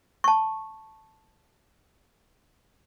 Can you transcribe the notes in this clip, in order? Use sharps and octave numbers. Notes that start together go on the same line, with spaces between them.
A5 C#6